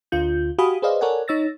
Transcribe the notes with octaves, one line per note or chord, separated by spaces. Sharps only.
D2 D3 F4 G6
F#4 G4 F5 G#5 B5 D#6
G#4 B4 C5 D5 D#5 F5
A4 A#4 C#5 D5 F#5 G#5
D#4 C#5 E6 A6 A#6